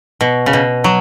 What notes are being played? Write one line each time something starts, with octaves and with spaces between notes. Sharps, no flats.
B2
C#3
B2
F#3